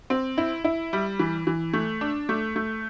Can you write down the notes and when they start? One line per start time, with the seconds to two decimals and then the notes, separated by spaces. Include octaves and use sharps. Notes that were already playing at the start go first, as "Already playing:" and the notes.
0.10 C4
0.38 E4
0.64 E4
0.93 G3
1.19 E3
1.47 E3
1.73 A3
2.01 D4
2.29 A3
2.56 A3